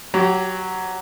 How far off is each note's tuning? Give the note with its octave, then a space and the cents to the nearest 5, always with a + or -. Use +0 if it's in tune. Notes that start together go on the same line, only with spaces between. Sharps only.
F#3 +5 G4 -20